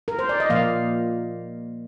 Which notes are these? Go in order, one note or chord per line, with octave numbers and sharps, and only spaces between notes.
A#4
C5
D5
D#5
A#2 F3 A#3 F5